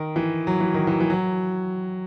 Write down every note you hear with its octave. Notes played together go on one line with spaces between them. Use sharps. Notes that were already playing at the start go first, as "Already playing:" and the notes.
Already playing: D#3
E3
F#3
E3
D#3
E3
E3
F#3